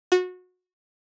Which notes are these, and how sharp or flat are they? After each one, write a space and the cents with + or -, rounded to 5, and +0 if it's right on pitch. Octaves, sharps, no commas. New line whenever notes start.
F#4 -25